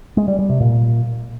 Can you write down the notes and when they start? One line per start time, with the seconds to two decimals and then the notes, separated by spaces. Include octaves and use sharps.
0.17 G#3
0.28 G3
0.39 G3
0.50 C3
0.60 A#2